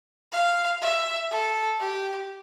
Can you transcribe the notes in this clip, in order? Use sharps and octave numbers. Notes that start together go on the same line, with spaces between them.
F5
E5
A4
G4